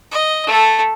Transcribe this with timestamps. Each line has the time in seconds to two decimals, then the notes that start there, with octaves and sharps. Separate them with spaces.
0.11 D#5
0.46 A3 A4